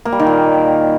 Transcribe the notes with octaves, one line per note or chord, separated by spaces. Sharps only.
A#3
G3
D#3
A#2